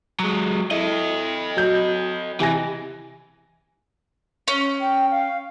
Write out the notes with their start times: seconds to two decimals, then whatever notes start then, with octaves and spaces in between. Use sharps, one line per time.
0.19 F#3 G#3
0.71 E4 A4 D#5
1.57 F#3 G6
2.40 C3 E3 G#5 A#6
4.48 C#4
4.81 G5
5.11 F5